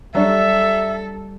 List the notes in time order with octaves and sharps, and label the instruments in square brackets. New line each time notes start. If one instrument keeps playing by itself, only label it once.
[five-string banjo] F#3 D4 [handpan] G3 [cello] A4 [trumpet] E5